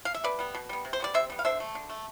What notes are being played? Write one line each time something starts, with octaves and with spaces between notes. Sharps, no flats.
F5
E5
B2 B4 D5
G3 B3
B2
G3 B3
C3
C5
G3 B3 D5
C3 C5 E5
G3 B3
F5
D3 C5 E5
A3
D3
A3